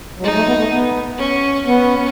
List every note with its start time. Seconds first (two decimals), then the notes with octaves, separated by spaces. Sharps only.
0.19 F#3
0.24 G#3 D#4
0.35 A3
0.48 B3
0.59 A3
0.71 B3
1.18 C#4
1.66 B3 C#4